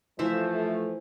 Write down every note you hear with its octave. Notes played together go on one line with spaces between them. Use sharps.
E3 F3 A3 C5 E5